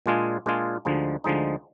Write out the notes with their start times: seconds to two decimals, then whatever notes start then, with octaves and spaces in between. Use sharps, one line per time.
0.06 A#2 G#3 D4 F4 G#4
0.46 A#2 G#3 D4 F4 G#4
0.85 D2 D3 F3 G#3 D#4
1.24 D2 D3 F3 G#3 D#4